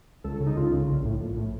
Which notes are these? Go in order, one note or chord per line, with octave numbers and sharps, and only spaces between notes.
C#2 A4
C#3
D#4
C#2 F4
C#3
A#1
A2
A#1
A2